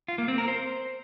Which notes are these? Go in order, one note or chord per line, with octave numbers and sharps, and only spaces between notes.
F4
A#3
C4
A#4
C5